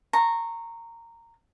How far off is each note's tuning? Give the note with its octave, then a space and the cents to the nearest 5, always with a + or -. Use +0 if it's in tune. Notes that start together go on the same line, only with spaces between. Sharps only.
A#5 -15 C#6 -25